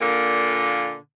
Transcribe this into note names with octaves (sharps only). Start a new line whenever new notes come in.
A#2 D3 A#3